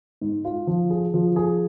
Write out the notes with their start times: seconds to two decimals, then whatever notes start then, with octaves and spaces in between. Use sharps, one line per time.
0.21 G#2
0.45 F4
0.67 F3
0.90 G#4
1.14 F3
1.36 G#4